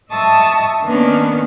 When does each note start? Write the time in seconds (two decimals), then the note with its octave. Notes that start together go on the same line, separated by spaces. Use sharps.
0.12 D#5 E5 A5 C#6 D#6 E6
0.84 D#3 A#3 B3 C#4 D4